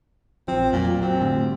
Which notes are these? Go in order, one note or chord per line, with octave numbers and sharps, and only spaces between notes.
A#1 F3 C4
F2 A#2 F#3 A#3
F#3 C4
A2 D3 G3